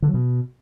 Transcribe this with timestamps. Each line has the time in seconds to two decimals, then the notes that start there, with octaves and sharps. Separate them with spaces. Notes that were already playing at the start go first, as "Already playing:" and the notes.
0.02 D3
0.08 F#3
0.14 B2